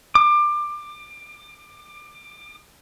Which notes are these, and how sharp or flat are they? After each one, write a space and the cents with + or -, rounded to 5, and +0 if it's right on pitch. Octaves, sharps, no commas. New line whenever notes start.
D6 +25